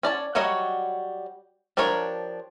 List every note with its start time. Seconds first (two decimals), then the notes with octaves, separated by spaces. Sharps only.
0.03 C#4 D5 A5
0.35 F#3 G3 F#4 C#5 D#5
1.77 F3 D4 G4 A#4 C#5